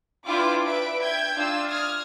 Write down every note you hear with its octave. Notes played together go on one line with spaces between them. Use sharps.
D4 E4 F4 B4 G5 D6
B4 E5 D7
E5 G5 G6 G#6
D4 F4 F5 E6
D#6 F6 G#6